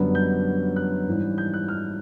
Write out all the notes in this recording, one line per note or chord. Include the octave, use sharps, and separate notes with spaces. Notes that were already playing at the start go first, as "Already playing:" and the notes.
Already playing: F#2 D3 G3 B3
G6
F#6
G#2 E3 G3
G6
F#6
F6